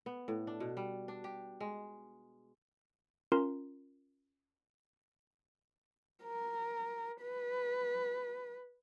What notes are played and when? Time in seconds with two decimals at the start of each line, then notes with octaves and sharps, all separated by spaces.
0.06 B3
0.28 A2
0.47 D4
0.60 B2
0.77 G3
1.08 D4
1.24 G4
1.60 G#3
3.32 C#4 F4 A#4 A#5 C6
6.24 A#4
7.22 B4